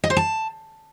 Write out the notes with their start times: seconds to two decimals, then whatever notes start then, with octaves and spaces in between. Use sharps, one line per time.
0.04 D#5
0.10 C5
0.17 A5